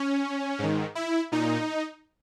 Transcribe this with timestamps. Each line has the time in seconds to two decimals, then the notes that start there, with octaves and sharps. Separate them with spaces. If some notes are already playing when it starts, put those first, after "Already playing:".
Already playing: C#4
0.59 G#2 D#3
0.95 E4
1.32 A#2 D#4